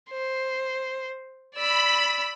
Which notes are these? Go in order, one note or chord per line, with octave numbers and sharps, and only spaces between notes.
C5
D5 B5 E6